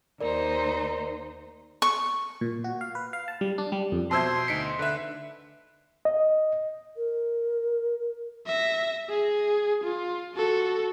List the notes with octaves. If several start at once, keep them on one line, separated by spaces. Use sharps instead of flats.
D#2 D#4 A#4 C5 D5
C#6
A#2
F#4
F5
B4
F5
A5
G3
D4
G3
F2
B2 C5 E5 A5 C6 E6 G#6
D2 D#4 B6 C#7 D7
D3 B4 E5
D#5
A#4
E5 A#6
G#4
F4
F#4 A4